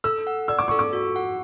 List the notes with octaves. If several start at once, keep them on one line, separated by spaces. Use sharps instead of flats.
A4 E6
F#5
D5 E6
D6
A4 C#6
D6
F#4
F#5